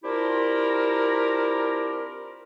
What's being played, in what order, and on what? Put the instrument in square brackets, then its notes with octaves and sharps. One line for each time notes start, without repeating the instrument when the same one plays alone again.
[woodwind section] C4 D4 E4 F4 G4 A#4